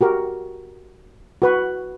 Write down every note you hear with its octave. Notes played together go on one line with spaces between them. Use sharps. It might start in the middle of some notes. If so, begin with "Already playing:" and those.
F#4 G4 A#4
F#4 B4 C#6